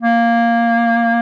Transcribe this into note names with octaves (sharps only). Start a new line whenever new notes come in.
A#3